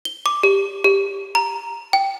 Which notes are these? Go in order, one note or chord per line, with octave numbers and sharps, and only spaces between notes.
G7
D6
G4
G4
A#5
G5